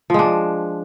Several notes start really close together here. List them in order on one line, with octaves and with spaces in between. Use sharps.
F3 G#3 D4